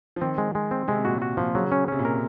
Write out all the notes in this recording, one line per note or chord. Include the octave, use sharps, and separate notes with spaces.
F3
D#3 C4
G#3
G#3
C4
C3 G#3
A#2 F#4
F#4
A#2 F3
C#3 F#3
C#4
C3 C#4
A#2
A#4